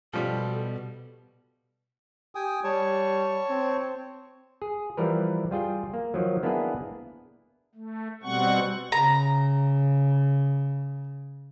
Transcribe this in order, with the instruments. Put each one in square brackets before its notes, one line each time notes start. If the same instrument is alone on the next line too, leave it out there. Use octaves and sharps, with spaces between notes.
[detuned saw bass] B2 [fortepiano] F3 G3 [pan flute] A4
[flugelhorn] G4 [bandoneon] G5 G#5 D#6
[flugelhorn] G3 [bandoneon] C#5 A5 C#6
[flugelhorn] C4
[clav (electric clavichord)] G#4
E3 F3 G3 A#4 B4
G3 F4 G#4 G5
A#3
D#3 F3 F#3
A#3 B3 D4 E4 G#4 B4
[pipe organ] A3
B2 G3 C4 F#5 C#6
[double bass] C#3 [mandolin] A#5